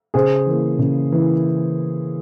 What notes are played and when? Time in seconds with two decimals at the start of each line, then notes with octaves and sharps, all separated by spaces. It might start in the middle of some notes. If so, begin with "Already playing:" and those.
0.14 C#3 G#4 C5
0.46 E3 A#3
0.79 C#3
1.12 E3